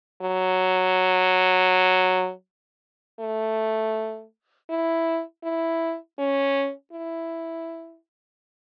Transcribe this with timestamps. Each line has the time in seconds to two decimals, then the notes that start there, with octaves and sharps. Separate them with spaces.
0.22 F#3
3.20 A3
4.69 E4
5.44 E4
6.19 C#4
6.92 E4